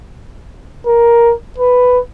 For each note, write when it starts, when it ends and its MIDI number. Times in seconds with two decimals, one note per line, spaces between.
0.86 1.33 70
1.58 1.99 71